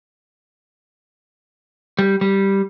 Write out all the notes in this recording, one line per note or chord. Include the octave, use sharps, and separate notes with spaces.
G3
G3